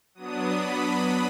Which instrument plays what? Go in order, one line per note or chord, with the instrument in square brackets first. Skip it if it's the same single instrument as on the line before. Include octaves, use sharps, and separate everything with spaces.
[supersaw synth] F#3 B3 D4 D#6
B5